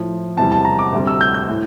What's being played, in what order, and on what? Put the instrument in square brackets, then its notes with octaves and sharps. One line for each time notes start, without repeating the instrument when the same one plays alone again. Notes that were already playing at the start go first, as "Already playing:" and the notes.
Already playing: [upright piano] A2 F3
E2 C3 G3 A5
A5
A#5
D6
D2 C3 G3
E6
G6
G6
A2